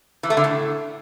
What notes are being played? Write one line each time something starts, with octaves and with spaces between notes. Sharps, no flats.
E3
A3
D3
A2